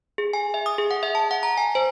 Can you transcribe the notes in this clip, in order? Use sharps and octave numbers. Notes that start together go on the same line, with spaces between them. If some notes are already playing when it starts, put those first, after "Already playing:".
G#4
G#5
E5
D#6
G#4
F#5
E5
A5
F#5
A#5
G#5
C5